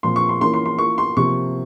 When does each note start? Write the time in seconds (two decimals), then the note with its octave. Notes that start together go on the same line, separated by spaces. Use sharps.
0.03 A#2 F3 C4 C6
0.16 C#6
0.29 C6
0.41 E3 A#3 C#4 F4 C6
0.54 C6
0.66 C6
0.78 E3 A#3 F4 C#6
0.98 C6
1.16 C3 F3 A#3 C#6